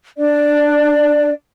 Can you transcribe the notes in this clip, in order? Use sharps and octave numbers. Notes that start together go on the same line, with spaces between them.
D4 D5